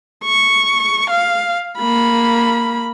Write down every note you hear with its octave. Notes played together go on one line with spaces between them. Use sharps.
C#6
F5
A#3 B5